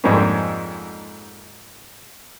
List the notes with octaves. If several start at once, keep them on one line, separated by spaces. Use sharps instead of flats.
F2 G#2 F3 G3 A#3 C#4